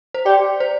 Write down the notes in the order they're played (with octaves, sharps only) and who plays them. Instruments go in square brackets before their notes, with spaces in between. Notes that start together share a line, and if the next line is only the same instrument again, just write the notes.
[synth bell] C5
[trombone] G4 [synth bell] D5
[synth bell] C5